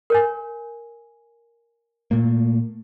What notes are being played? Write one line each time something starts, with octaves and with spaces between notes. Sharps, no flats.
A#4 C#5 G#5
A#2 A3 A#3